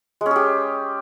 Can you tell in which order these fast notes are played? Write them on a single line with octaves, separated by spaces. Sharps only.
G#3 C#4 G#4 G4